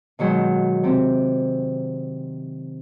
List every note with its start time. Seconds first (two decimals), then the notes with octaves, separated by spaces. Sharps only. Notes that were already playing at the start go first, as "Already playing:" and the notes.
0.19 B2 D#3 F#3 G#3
0.83 C3 C4